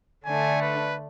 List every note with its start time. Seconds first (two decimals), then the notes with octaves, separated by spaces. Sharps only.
0.25 D3 A3 D4 G#5
0.62 B4